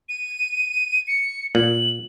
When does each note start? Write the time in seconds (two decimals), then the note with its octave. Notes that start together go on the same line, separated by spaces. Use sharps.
0.09 D#7
1.08 C#7
1.55 A#2 F#7